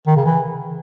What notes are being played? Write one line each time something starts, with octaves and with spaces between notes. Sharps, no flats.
D#3
C#3
E3